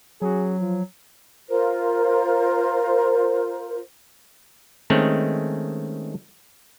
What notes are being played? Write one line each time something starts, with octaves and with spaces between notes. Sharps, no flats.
F#3 C#4 F#4 G#4
F3
F4 A#4 C5
D#3 G#3 A3 C4 C#4